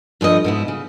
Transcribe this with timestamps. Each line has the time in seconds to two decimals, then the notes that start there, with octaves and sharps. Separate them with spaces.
0.21 G2 F3 A3 D#5
0.44 G#2 B2 E4
0.68 C#3